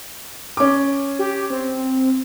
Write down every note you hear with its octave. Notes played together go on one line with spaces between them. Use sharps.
C#4 D6
G4
C4